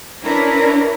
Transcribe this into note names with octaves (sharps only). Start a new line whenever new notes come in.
C#4 D4 E4 A#4 B4 C#5